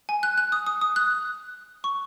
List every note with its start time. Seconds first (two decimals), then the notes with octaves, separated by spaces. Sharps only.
0.09 G#5
0.23 F#6
0.38 F#6
0.52 D#6
0.66 D#6
0.81 D#6
0.96 F#6
1.84 C#6